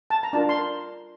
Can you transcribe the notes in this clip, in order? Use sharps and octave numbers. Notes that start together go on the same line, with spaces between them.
A5
A#5
D4 F4 A#4 A5
C6